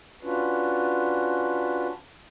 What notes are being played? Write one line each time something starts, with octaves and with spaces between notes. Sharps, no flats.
C#4 D4 F4 F#4 B4